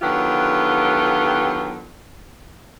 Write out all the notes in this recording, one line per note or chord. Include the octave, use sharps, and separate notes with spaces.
D3 D#3 F#3 B3 F4 G4